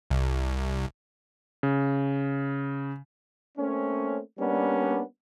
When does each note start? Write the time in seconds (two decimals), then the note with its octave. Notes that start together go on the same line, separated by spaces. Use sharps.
0.11 C2
1.63 C#3
3.58 A3 A#3 C4 C#4
4.38 G3 A#3 B3 C#4 D4